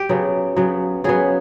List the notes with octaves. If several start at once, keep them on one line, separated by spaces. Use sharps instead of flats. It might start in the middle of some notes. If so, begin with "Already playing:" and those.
Already playing: G4
C#3 F#3 B3
C#3 F#3 B3
C#3 F#3 B3 G#4